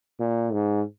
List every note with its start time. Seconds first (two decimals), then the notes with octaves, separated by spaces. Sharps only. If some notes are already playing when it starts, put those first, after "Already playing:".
0.20 A#2
0.53 G#2